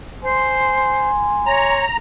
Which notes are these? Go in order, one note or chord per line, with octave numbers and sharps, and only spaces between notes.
C5 G#5 C6
C#5 A#5